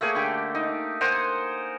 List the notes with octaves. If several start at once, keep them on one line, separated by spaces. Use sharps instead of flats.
A3 A#3 G#4 C#5
D3 G4
D#4
A#4 C5 F#5 G#5